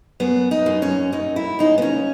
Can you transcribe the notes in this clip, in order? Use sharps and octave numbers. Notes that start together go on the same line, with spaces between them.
F#2 B3
D#4
F#2
C#4
F#2 D#4
E4
C#3 D#4
B3
C#4